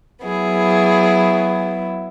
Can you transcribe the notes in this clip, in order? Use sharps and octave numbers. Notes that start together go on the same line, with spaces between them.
F#3 B3 E4 G#4